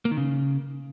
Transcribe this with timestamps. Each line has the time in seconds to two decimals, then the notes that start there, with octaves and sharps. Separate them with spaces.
0.05 A#3
0.11 D#3
0.17 C#3